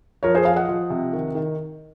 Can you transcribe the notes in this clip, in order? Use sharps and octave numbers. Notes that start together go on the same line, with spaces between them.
F3 A#4 C#5
G#4 C5
F3 F5 G#5
D#5 F#5
F3
C3
D#3
D#3